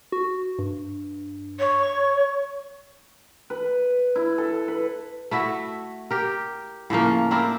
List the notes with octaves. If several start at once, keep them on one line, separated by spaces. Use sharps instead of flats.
F#4
G2
C#5
C#6
B4
E4
A4
B4
A3 E4 F#4 E5
G4 A#4
A2 C#3 F3 A#3
C4 D4 E4 A#4